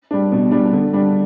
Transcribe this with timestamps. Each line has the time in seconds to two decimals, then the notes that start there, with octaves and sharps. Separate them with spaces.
0.11 G3 D4
0.32 B2
0.51 G3 D4
0.73 D3
0.93 G3 D4